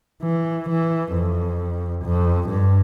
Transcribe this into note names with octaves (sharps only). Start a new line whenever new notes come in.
E3
E3
F2
F2
G2